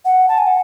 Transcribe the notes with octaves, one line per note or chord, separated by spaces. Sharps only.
F#5
A5
G#5
F#5